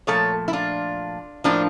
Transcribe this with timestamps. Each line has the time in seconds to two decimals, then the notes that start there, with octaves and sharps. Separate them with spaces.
0.07 A#2 F3 A3 A4 C#5
0.48 E4
0.53 D4 F4
1.44 A2 F3 A#3 D4